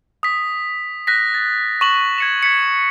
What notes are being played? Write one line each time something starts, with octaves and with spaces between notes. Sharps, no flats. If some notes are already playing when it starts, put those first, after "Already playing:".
D#6 B6
F#6 A#6 B6
A6
C#6 E7 F#7
G#6 C#7 E7
G#6 B6 C#7